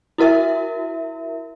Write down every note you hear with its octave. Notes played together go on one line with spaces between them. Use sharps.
E4 F#4 A#4 E5